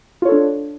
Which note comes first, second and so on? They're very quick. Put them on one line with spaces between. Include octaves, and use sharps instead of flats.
F4 C#5 A4 D4